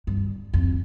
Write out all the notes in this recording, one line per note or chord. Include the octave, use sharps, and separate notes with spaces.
G2
F2